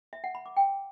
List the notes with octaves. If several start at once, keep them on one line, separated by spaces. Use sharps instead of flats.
E5
F#5
B5
D6
G5